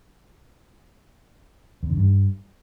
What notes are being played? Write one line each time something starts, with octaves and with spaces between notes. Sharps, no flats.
E2
D3
G2